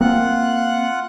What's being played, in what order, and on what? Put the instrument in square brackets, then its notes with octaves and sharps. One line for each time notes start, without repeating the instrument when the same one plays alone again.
[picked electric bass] A#3 C4 [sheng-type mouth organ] F4 F#5 F#6